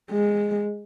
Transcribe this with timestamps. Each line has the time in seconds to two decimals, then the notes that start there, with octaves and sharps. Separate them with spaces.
0.11 G#3